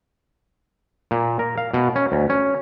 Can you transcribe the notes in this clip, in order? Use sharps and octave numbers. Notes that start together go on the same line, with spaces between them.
A#2
A#4
F5
B2
C#4
D2
C#4